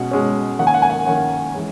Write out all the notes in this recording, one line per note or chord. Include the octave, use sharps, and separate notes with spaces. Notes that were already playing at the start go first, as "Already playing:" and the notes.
Already playing: B2 G#3 C#4 F#5
B2 G#3 C#4
D#3 A#3 C#4 F#5
G#5
F#5
G#5
F#5
D#3 A#3 C#4 F#5
E3 G#3 C#4